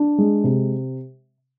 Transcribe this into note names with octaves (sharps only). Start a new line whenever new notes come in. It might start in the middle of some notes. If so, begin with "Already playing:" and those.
Already playing: D4
G#3
C3